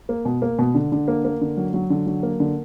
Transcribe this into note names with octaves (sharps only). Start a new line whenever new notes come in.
A#3
B2
A#3
B2
D3
D3
A#3
A#3
D3
F#3
F#3
D3
F#3
A#3
D3